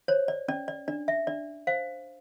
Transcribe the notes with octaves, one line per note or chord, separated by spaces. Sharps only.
C5 C#5
D5
C#4 D5
D5
D4 D5
E5
D4 D5
C5 F5